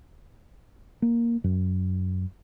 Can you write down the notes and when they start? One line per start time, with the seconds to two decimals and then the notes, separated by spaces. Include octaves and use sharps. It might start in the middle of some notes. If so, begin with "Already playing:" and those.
1.02 A#3
1.44 F#2